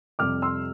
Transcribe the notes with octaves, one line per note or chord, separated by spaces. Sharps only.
F2 C3 G3 D6 F6
C6 E6